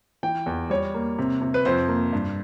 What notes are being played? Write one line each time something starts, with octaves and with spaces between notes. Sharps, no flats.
E3 G5
E2
G3 C#5
A#3
C3
C3
B4
F2 C5
A#3
G2